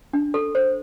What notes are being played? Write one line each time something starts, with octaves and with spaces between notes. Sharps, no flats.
D4
A4
C5